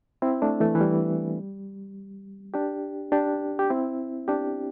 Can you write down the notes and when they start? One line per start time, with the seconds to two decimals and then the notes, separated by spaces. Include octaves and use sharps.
0.22 C4 E4
0.42 A3 D4
0.60 E3 A3
0.75 E3
0.81 G3
2.54 D4 G4
3.12 D4 G4
3.59 G4
3.70 C4 E4
4.28 D4 G4